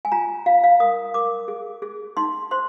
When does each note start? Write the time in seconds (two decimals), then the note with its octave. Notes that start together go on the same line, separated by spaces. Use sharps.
0.05 G#5
0.12 F4 A#5
0.46 F4 F5
0.64 F5
0.80 A#4 D#6
1.14 A#4 D6
1.48 G#4
1.82 G#4
2.17 D#4 C6
2.51 C5 C6